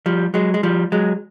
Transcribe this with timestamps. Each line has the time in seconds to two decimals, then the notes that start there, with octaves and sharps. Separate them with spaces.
0.06 F3 G3
0.34 F#3 G#3
0.54 G#3
0.63 F3 G3
0.92 F#3 G#3